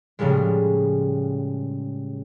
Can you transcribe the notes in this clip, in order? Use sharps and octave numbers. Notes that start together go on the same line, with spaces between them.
A2 C#3 F3 G3 G#3